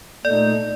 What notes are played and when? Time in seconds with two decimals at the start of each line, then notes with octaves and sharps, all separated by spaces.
0.25 A#2 A3 D#4 D5